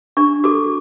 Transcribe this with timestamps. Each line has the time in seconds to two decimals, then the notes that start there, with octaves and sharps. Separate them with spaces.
0.17 D4 C#6
0.44 F#4 A4 D6